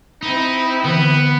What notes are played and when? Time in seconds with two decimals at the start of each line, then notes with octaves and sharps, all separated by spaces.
0.23 C4 D#4 E4
0.85 D3 E3 B3